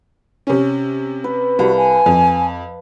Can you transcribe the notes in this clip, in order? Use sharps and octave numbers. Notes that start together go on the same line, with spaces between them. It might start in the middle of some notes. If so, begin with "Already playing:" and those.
C3 C#4
B4
C2 F#4 F5 A5
G#5
F2